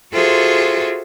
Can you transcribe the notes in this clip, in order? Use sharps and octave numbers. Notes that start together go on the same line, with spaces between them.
F4 F#4 G#4 A4 C5 E5